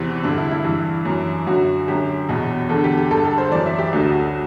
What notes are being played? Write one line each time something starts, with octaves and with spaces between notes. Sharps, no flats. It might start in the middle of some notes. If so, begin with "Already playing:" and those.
Already playing: E2 C3 E3 C4
G2 D3 D4
E4
E4
G2 E3
F#2 E3
F#2 D3 F#4
F#2 D3 G4
E2 B2
E2 D3 A4
G4
G4
G2 D3 A4
A4
C5
F#2 E3 D5
E5
G4
D2 D3 F#4